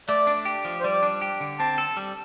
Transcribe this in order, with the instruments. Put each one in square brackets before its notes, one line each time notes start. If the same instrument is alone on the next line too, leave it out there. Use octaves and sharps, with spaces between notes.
[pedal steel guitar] A3 [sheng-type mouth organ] D5
[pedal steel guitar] D4
G4
F3
[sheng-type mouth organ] C5
[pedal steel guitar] G3 [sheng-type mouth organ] D5
[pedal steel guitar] D4
G4
D3
[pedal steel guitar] C4 [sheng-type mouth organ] A5
[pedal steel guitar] A4
G3